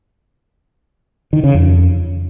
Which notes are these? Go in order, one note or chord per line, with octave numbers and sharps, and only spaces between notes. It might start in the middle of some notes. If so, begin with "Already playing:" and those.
D#3
C#3
F2